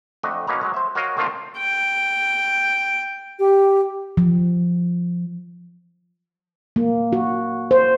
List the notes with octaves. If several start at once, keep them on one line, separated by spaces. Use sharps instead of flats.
F2 A3 D4 D#5 F#5
B2 A#3 C#4 D#4 B4 A#5
F#3 G#3 A#5
C5 E5
F#4 A#4 C#5 D#5 F5
D#3 A3 A#3 C4 D4 F4
G5
G4
F3
A#3
F#4
C5